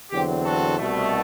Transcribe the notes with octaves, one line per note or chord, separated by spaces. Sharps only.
E2 D3 F#3 C4 G4
F#4 A4
C2 B2 A3